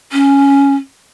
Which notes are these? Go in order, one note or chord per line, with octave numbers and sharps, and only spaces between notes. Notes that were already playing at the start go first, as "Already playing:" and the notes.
C#4